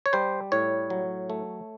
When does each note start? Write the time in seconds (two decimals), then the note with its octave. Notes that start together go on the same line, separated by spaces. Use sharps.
0.06 C#5
0.13 G3 C5
0.52 A2 C#5
0.90 F#3
1.30 A3